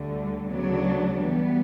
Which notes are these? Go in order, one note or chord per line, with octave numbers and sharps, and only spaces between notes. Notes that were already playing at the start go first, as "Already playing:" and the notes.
Already playing: D2 D3 G3
D2 C#3 F#3 B3 D4
E3 G3 B3